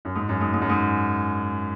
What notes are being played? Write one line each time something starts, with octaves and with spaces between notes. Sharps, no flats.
F#2
G#2
F#2
G#2
G#2
F#2
G#2